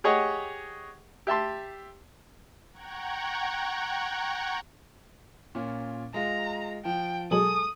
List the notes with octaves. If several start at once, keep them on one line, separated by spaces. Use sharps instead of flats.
G4 G#4 C#5 D#5 F#5
G4 E5 A5 C6
F#5 G5 A#5 C#6 F#6 G#6
A#2 C#4 F4
G#3 F4 A#5
F3 G5
B2 F#3 G#3 A4 G#5 D#6 F#7